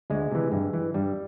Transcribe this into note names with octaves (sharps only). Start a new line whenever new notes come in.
D2 G#3
C3 E3
G2
E3
G2 G3